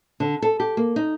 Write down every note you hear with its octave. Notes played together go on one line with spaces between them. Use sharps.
D3
A4
G4
A#3
D#4